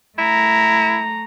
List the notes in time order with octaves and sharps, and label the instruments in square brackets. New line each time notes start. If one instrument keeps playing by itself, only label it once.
[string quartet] A3 A#5 [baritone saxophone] E4